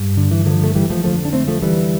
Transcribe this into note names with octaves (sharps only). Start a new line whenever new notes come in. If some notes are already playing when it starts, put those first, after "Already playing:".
Already playing: G2
D3
E3
D3 F3
A3
E3 G3
F3 A3
F2 D3 F3 A3
D4
A3 C4
F3 A3
E3 G3